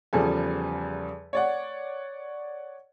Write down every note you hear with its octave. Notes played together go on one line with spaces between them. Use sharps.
E2 C#3 F3 G3 A4 G#5
C#5 D5 F#5